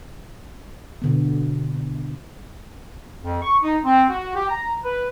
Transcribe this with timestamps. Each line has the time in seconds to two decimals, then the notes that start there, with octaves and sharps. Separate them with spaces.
1.02 B2 D3 B3
3.23 F2
3.42 C#6
3.62 D#4
3.84 C4
4.09 F#4
4.35 G4
4.49 A#5
4.83 B4